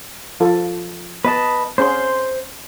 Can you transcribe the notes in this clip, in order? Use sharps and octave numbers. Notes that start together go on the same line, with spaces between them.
F3 F4 A4
B3 B4 D#5 A5
C4 C#4 G#4 C5 C6